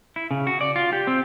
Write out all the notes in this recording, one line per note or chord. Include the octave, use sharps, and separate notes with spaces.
E4
C#3
F#4
D5
F4
G4
C4